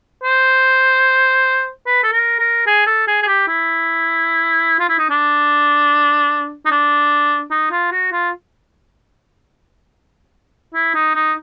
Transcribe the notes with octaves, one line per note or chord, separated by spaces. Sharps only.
C5
B4
A4
A#4
A#4
G#4
A4
G#4
G#4
G4
E4
F4
E4
D#4
D4
D#4
D4
D#4
F4
F#4
F4
E4
D#4
D#4